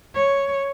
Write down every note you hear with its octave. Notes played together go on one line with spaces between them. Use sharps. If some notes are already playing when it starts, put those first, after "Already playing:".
C#5